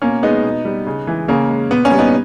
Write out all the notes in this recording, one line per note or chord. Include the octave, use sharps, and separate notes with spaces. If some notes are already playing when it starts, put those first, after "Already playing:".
B2 A#3 C#4
G#3 B3 D#4
B2
G3
C#3
E3 G#3
C#3 A#3 C#4
G#3
A#2 B3
A#3 C#4
G3
B3 D#4